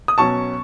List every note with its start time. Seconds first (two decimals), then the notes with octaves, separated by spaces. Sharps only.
0.08 D#6
0.18 B2 F#3 C#4 A5 C#6